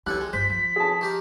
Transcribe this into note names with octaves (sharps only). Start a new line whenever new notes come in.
E3 G4 A4 G#5 F#6
G#3
G1 C5 B6
F3 B6
G#4 A5
D#3 G4 A#4